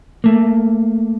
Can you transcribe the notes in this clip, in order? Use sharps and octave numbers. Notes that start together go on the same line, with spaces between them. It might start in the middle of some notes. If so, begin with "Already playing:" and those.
A3 A#3